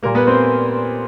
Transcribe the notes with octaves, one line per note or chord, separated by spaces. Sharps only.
A#2 G3 A#3 A#4
B3 B4
C4 C5